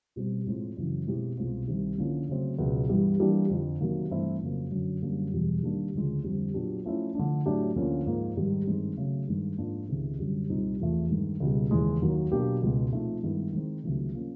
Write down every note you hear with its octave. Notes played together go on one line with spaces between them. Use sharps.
B2 G3 C4
A2 F3 G#3 C4
F#2 C#3 E3
B2 G#3 C4 E4 G4
C2 B2 G#3 C4 F4
C2 C3 D#3 G3 C4
D3 F3 A#3 C#4 E4
C#3 F#3 A3 C4
C#2 B2 F#3 B3
G2 E3 G3 B3 E4
E3 G3 A#3 D4 G4
F2 D3 F3
C3 D#3 F#3 A#3
G2 E3 A3 C4 E4
F2 C#3 F#3 A#3
F#2 D3 F#3
F#2 D3 G3 A#3
E2 B2 G3
D#3 G3 A#3 D4
D2 C#3 F3 G#3
F2 D3 G3 C4
A#2 F#3 B3 D4 G4
F3 A3 C#4 E4
D3 F3 A3 D4
A2 F#3 A3 D4 G4
D2 D3 F3 A#3 C#4
G#2 F3 A#3
G#2 D#3 G3
G2 D#3 G#3 C4 D#4
C#3 F#3 A3
G2 D#3 G#3
G#2 F3 A#3 D4 F4
C#2 C3 D#3
F#2 D3 G3
C2 A#2 G3 C4 D#4
E2 C3 F3 A3
G2 D#3 G#3
C#2 B2 G3
D#2 C#3 E3 G#3
D#2 D#3 F#3 A#3
B2 F#3 A#3 D4 G4
C#2 B2 G#3
A#2 F3 A3 C4 D#4
G2 D#3 G#3 B3 E4
D#3 G#3 C4
C#2 C3 D#3 F#3 A3
F3 A#3 C#4